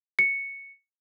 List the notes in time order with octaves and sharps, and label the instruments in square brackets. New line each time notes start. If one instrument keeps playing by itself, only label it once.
[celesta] C#7